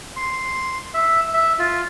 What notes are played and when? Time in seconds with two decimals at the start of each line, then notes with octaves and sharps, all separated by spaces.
0.17 C6
0.94 E5
1.34 E5
1.59 F4